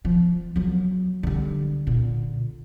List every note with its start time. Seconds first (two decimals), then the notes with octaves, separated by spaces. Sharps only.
0.05 F3
0.56 F#3 A#3
1.23 D3 G3
1.87 A#2 D3